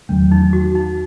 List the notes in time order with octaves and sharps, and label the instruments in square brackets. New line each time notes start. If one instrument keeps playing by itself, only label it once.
[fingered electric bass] E2 D#3 F#3 A3 [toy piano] C#4
[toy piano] D#4
F#4
D#4